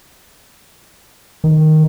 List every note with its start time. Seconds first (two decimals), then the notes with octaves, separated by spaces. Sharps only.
1.44 D#3